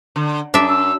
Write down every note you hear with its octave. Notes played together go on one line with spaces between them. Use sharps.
D3
F#2 D4 E5
E6